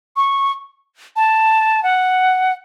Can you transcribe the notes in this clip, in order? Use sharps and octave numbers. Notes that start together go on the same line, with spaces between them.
C#6
A5
F#5